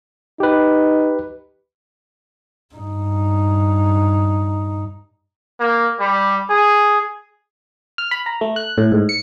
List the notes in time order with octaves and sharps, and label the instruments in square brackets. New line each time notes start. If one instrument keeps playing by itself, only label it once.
[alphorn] D#4 [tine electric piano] G4 B4
[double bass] G2 D#4
[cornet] A#3
G3
G#4
[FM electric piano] F6
B5
A#5
A3
F#6
A2
G#2
C#7